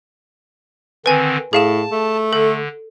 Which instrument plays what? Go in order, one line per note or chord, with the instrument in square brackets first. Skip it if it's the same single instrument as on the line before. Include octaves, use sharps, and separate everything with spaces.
[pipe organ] D3 D#3 C4 [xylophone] B4 G#5
[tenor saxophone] A2 [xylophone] G#4 F5 E7 [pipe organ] A5
[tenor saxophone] A3
[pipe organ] D3 [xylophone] A4